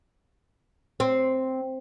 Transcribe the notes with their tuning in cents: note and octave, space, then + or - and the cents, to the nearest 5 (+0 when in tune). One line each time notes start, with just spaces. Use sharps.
C4 +0